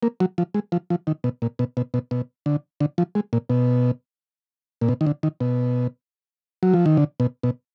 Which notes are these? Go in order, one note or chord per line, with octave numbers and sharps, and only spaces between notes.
A#3
F#3
F3
G#3
F3
F3
D#3
B2
A#2
B2
B2
B2
B2
D3
D3
F3
G#3
A#2
B2
A#2
B2
D#3
D3
D#3
B2
F#3
F3
D#3
D3
B2
B2